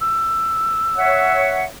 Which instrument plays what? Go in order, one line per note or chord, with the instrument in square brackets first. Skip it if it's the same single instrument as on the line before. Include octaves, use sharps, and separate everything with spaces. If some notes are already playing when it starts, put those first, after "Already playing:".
[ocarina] E6
[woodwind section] C#5 E5 F#5